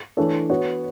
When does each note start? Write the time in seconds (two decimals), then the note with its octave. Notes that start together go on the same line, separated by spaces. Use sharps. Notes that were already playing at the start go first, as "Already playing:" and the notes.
0.17 E3 A3 D4 A4 C#5
0.50 B3 F#4 C#5